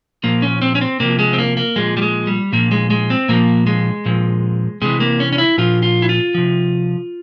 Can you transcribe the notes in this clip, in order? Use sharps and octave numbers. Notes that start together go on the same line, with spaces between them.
A#2 F3 A#3
C#4
C4
C#4
C4
C3 F3 A#3
G#3
C4
A#3
A#3
A#2 F3 G#3
G3
G#3
G3
A#2 F3 A#3
G#3
G#3
C4
A#2 F3 A#3
G#3
A#2 F3
C3 E3 G#3
A#3
C#4
C#4
E4
A#2 F3 F4
F4
E4
F4
C3 F3